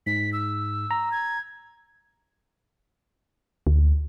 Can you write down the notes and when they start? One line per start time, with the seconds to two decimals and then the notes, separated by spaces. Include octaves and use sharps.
0.06 G#2 B6
0.33 E6
0.91 A#5
1.12 G#6
3.67 D2